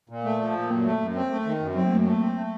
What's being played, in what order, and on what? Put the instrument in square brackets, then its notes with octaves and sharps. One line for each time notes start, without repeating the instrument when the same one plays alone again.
[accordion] A#2
A3
F3
A#2
[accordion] F#2 [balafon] A#3
[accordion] A3
F#2
C4
A3
D#3
F#2
[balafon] F#3 [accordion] C4
[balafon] A#3
[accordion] F#2 [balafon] A3
[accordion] A3 [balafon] A#3
[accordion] C4
A3